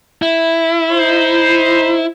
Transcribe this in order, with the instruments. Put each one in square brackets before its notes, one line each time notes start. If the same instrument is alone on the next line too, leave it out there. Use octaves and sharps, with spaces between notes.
[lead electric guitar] E4
[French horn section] D#4 C5